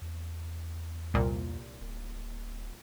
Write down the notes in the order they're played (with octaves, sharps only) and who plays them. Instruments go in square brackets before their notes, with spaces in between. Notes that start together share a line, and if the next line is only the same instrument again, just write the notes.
[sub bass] E2
[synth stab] C2 A#2
[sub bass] D1